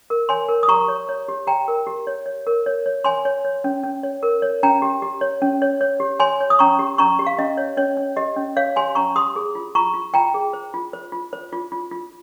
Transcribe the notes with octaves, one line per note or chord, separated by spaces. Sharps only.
A#4
C#5 G#5 C6
A#4
D#6
G4 A#5 C#6
C#5
C#5
G4
G4 G5 A#5
A#4
G4
C#5
C#5
A#4
C#5
C#5
C#5 G#5 C6
C#5
C#5
C#4
C#4
C#5
A#4
C#5
C#4 G5 A#5
G4
G4
C#5
C#4
C#5
C#5
G4
C#5 G#5 C6
C#5
D#6
C#4 A#5 C#6
G4
C#4 A#5 C#6
G4
F5
C#4 D#5
C#5
C#4 C#5
C#4
G4 D#5
C#4
C#5 F5
G4 G#5 C6
C#4 A#5 C#6
G4 C6 D#6
G#4
F4
F4 A#5 C#6
F4
F4 G5 A#5
G#4
C5
F4
C5
F4
C5
F4
F4
F4